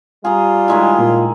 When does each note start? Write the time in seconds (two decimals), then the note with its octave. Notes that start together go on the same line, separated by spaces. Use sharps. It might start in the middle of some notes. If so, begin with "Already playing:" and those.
0.24 G3 F4 G#4 A#5
0.68 D#3 G#3 E4
0.98 A#2